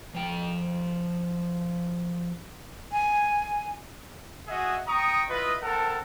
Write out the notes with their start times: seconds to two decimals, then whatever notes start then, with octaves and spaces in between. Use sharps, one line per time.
0.15 F3 G5
2.92 G#5
4.48 F#4 G#4 D#5 E5 F#5
4.88 G5 A#5 C#6 D#6
5.30 E4 F4 B4 D#5
5.62 C4 A4 A#4 F#5 A5